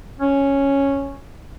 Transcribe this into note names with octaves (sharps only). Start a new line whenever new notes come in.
C#4